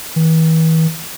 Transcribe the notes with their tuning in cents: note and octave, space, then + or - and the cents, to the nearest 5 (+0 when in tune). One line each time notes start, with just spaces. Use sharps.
E3 -40